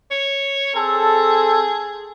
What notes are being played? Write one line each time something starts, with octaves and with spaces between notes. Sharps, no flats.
C#5
C4 G#4 A4